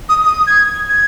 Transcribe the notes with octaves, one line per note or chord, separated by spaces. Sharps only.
D#6
D#6
G#6
G#6